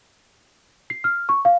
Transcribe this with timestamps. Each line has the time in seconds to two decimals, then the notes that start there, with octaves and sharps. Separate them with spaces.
0.90 C7
1.04 F6
1.29 C#6
1.45 F5